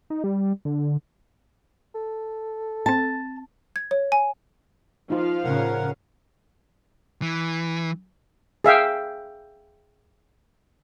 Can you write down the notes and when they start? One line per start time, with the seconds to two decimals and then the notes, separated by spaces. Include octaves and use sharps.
0.10 D#4
0.24 G3
0.65 D3
1.95 A4
2.86 C4 A5 A6
3.76 G#6
3.91 C#5
4.12 G#5
5.10 F3 D#4 F4 F5
5.44 A2 C#3 C#4 A#4 F#5
7.22 E3
8.64 G#4 E5 F5 G5